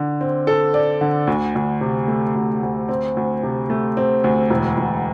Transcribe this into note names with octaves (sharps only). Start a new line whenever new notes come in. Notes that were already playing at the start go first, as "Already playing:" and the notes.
Already playing: D3
C4
A4
D5
D3
D2
D2
C3
A3
D2
D2
C4
D2
C3
A3
C4
D2
E1
E1